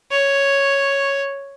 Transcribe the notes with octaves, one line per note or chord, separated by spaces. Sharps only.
C#5